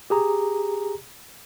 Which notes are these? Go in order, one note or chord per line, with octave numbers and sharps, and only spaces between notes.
G4 G#4 A#5